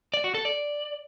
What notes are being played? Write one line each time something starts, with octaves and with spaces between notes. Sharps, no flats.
D5
F#4
A4
D5